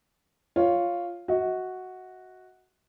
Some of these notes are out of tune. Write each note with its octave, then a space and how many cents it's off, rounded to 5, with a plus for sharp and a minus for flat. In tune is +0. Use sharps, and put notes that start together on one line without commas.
F4 +0 C#5 +0
F#4 +0 D#5 +45